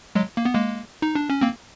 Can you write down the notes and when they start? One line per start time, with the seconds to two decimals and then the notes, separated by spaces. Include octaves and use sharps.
0.15 F#3 G#3
0.37 A#3
0.45 B3
0.55 G#3 A#3
1.02 D#4
1.15 D4
1.30 C#4
1.41 A#3 C4